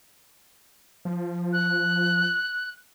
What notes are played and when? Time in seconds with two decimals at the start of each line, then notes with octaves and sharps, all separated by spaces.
1.05 F3
1.53 F#6